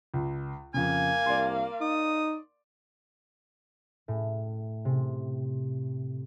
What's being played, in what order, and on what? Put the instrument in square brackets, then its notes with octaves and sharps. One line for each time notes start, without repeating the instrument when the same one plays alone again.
[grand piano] C#2
[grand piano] F2 C#3 [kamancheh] A#3 F5 [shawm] G#5
[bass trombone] C2 [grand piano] D5 C6
[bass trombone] D#4 [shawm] D#6
[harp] A2
C3